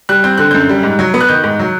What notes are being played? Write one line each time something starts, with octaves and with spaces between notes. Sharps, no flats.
G3 F#6
C4 G6
D3 F#6
F#2 G6
G3
G#2
F#3
B3
F#6
D#3 G6
G#2
F#3